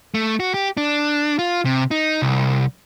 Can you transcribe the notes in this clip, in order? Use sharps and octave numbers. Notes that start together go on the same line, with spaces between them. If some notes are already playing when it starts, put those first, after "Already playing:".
A3
F#4
G4
D4
F4
C3
D#4
C2